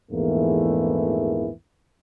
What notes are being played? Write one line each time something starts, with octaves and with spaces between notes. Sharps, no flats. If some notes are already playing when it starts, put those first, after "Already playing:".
A#1 E2 G#2 E3 A3 A#3